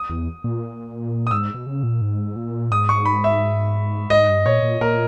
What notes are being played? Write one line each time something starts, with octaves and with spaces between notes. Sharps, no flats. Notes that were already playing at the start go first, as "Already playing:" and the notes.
Already playing: D#6
E2
A#2
D#6
G#2 E6
B2
C#3
A#2
G#2
A#2
G#2 D#6
C#6
B5
E5
G#2 D#5
G2
A#2 C#5
A#2
A#2 A#4